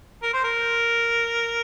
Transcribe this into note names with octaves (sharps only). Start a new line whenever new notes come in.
A#4
C5
A#4